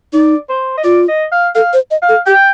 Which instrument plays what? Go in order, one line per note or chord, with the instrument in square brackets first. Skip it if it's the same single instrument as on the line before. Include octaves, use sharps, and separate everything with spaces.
[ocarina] D#4 [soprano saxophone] D5
[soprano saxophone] C5
D#5
[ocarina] F4 [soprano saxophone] D5
[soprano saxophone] D#5
F5
[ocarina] A4 [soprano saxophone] F5
[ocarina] C5
D#5
[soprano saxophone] F5
[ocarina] A4
[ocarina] G4 [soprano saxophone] G5